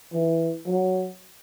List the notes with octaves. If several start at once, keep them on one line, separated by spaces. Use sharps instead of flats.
E3
F#3